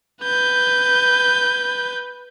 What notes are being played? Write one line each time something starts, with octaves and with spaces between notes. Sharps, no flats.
B4 G6